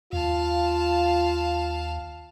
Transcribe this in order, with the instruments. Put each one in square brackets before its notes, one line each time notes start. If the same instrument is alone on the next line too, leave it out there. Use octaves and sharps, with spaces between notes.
[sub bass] D#2 [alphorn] F4 [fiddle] F5 A5